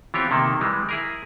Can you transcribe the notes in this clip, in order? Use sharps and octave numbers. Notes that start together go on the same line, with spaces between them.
E3 B3 C4 F4 G4 C#5
C3 D#3 A#3 A4
E3 G3 G#3
E4 G#4 A#4